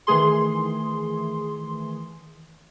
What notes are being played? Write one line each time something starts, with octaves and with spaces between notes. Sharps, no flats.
D#3 E3 A3 G#4 C6